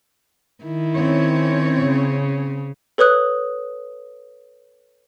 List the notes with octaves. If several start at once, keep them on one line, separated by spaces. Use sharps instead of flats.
D#3 E4
C4 C#4 C#5
C#3
A4 B4 C#5 D#6 F#6